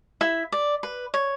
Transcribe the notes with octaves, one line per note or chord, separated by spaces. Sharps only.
E4 E5
D5
B4
C#5